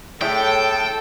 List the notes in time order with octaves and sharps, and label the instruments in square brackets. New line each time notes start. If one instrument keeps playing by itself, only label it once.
[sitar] A2 [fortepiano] G#4 C#5 E5 [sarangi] A4 [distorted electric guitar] G5